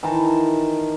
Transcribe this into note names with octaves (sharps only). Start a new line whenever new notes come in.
D#3 E3 A5 A#5